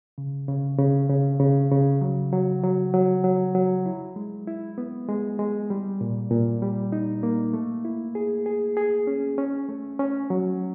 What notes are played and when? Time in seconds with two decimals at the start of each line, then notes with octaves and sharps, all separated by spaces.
0.18 C#3
0.48 C#3
0.79 C#3
1.10 C#3
1.40 C#3
1.71 C#3
2.01 F#3
2.33 F#3
2.63 F#3
2.94 F#3
3.24 F#3
3.55 F#3
3.86 E4
4.16 G#3
4.47 E4
4.78 B3
5.08 G#3
5.39 G#3
5.70 G3
6.01 A#2
6.31 A#2
6.62 G3
6.92 D#4
7.23 A#3
7.53 A3
7.85 E4
8.15 G#4
8.46 G#4
8.77 G#4
9.07 C#4
9.38 C#4
9.69 A3
9.99 C#4
10.30 F#3